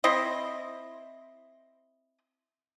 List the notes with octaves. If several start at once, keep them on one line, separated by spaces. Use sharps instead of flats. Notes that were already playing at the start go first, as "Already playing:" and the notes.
C4 E4 D#5